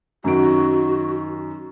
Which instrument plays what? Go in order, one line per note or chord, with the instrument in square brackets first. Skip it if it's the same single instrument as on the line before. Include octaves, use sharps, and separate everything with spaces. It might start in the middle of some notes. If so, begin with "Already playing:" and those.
[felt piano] F#2 D#3 D7 [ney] F#4